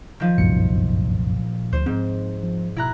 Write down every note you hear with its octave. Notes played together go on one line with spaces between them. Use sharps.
D#3 F3
G1 C2 F#2 A#2 C#7
D2 C5
G#2 C4
F3
B2 E4 A#5 F#6